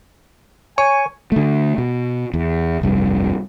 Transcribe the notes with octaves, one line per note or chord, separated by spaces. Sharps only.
C#5 G#5 C#6
D3 A3
B2
E2
F1 C2 G2